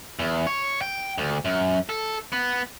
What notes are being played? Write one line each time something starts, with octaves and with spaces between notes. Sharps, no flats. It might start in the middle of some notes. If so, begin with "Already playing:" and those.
E2
C#5
G5
D2
F#2
A4
B3